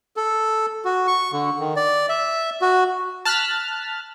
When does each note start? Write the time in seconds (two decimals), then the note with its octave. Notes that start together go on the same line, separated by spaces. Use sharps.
0.17 A4
0.85 F#4
1.07 C#6
1.32 D3
1.60 D#3
1.76 D5
2.09 E5
2.62 F#4
3.25 A5 F6 F#6 A6 B6